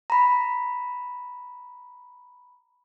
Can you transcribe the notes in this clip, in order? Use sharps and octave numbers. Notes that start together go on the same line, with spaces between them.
A#5 B5